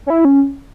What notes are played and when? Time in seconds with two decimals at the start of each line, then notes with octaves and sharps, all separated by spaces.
0.06 C#4
0.10 E4
0.25 C#4